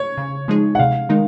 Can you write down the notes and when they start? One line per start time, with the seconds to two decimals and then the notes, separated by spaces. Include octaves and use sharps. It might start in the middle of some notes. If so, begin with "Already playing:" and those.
Already playing: C#5
0.18 C#3
0.48 F3 G#3 D#4 G#4
0.75 F#5
0.79 C3 F5
1.09 D#3 G#3 D#4 A#4